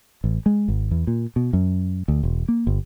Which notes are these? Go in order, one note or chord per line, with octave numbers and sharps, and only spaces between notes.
A1
G#3
G#1
E2
A#2
B2
F#2
D2
E1
A#3
G1